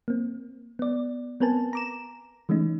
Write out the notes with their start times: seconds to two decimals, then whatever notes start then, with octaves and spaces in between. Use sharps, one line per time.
0.08 A#3 C4
0.79 B3 D5
1.40 B3 C4 A#4 B4 G#5 A5
1.73 A#5 D6 E7
2.49 E3 G#3 A3 C#4 D#4